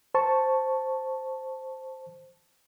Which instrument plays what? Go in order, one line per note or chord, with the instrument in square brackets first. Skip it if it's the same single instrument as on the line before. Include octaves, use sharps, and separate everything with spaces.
[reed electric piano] C5 A5 C#6